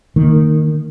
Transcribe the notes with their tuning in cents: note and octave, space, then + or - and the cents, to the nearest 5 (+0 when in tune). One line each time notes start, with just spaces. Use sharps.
D#3 -10 A#3 -25